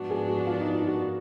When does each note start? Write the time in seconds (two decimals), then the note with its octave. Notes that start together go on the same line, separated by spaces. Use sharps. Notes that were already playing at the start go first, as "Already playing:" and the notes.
Already playing: G#2 F3 G#3 B3 D4 F#4
0.10 G#4
0.28 F#4
0.47 F4
0.61 D#4
0.75 F4
0.87 F#4